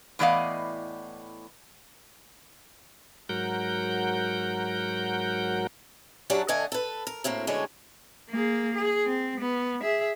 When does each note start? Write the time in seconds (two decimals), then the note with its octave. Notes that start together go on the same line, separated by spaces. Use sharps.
0.19 A2 E3 B3 D5 D#5 F5
3.29 G#2 F#3 A#4 F#5 G6
6.30 F#2 F#3 D4 G4 F#5 A5
6.48 D3 A3 D4 D#5 F#5 G#5
6.72 A4 B4
7.07 A#4
7.24 D2 A2 A#3 C4
7.47 D2 D3 G#3 B3 C#4 C#5
8.30 A#3 G#4
8.73 G#4
9.05 C4
9.40 B3
9.82 G#4 E5